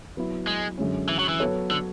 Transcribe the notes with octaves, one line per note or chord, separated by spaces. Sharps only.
F#3 B3 E4
G#3
F#2 D3 G#3 C#4
E3
F#3
E3
F#3 B3 F#4 A4 C#5
D3